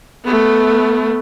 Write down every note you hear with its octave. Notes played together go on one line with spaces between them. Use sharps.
A3 B3